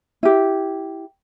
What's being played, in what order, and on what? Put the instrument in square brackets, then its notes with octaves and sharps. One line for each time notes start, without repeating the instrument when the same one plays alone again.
[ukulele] E4 G4